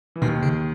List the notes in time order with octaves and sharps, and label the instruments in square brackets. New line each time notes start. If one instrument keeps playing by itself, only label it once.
[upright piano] E3
[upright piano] D#2 D#3 [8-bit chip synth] B2
[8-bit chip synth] C#3